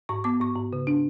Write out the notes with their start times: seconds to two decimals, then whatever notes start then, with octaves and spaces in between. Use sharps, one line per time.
0.09 G#2 C#6
0.24 B3 D6
0.41 G#2 C#6
0.56 G#2
0.73 C#3
0.87 D4